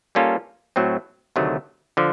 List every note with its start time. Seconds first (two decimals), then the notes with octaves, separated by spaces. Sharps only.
0.15 G3 A#3 C#4 F4 A4
0.76 A2 F#3 A3 C4
1.36 D2 C3 D#3 F#3 A3
1.97 D3 F3